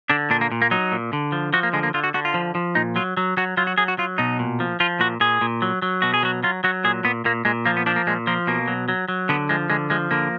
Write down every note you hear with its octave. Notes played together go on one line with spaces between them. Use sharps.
D3 D4
A#2 D4
A#3
A#2
A#3
F#3 D#4
A#2
D3
F3
F3 F#4
A#3
D3 G#3
A#3
D3 F4
F#4
D3 F#4
F4
F3
F3
A#2 D#4
F#3 F4
F#3
F#3 F#4
F#3 F4
F#4
F#3 G#4
F#4
F#3 F4
B2 D#4
A#2
F3
F3 F4
A#2 F#4
A#2 G#4
A#2
F#3
F#3
B2 F#4
G#4
F#3 F#4
F#3 F4
F#3 F#4
A#2 G#4
A#2 B3
A#2 A#3
A#2 G#3
F3 A#3
B3
F3 D4
A#3
A#2 G#3
F3 A#3
B2 A#3
F#3
F#3
F#3
D3 B3
F3 G#3
D3 G#3
F3 G#3
D3 A#3